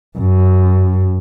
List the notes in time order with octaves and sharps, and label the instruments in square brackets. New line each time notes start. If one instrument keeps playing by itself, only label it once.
[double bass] F#2